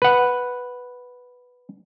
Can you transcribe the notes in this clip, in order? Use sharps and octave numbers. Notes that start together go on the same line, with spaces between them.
B4 F#5